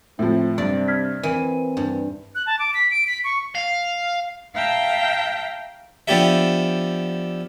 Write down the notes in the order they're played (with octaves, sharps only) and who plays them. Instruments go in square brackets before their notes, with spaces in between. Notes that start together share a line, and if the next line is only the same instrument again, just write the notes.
[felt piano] A2 F3 [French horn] C4 [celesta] E5
[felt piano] G2 [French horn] C3 [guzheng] D5
[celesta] F6 G#6 B6
[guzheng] E3 [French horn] C4 [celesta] A#4 [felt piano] D#7
[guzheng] G2
[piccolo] F#6
A5
D6
B6
D7
B6
C#6
[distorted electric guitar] F5
[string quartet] E5 F5 G5 A5 A#5
[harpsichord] F3 B3 D4 G4 A4 E5